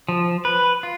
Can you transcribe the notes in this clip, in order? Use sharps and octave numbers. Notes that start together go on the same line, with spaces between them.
F3
B4
F4